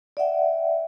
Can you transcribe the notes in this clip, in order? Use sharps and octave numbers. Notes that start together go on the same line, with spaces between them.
D5 E5 F#5 G5